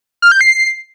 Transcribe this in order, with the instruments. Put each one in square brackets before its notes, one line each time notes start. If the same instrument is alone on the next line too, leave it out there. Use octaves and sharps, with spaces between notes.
[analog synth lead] F6
G6
C7